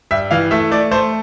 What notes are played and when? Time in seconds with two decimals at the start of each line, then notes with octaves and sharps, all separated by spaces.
0.11 G2 E5
0.31 E3 F5
0.51 A3 E5
0.71 A3 D5
0.91 A3 C5